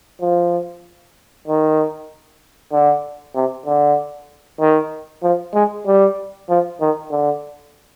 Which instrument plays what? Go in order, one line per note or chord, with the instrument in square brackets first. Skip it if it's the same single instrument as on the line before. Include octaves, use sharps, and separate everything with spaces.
[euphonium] F3
D#3
D3
C3
D3
D#3
F3
G#3
G3
F3
D#3
D3